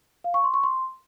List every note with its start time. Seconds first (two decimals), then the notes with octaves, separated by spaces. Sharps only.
0.24 F5
0.34 C#6
0.44 C6
0.54 C#6
0.64 C6